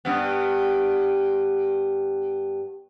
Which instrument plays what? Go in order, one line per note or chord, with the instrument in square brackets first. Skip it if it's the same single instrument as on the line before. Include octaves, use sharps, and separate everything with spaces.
[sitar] G2 B3